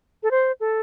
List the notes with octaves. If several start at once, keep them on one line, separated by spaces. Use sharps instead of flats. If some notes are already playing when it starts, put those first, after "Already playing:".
A4
C5
A4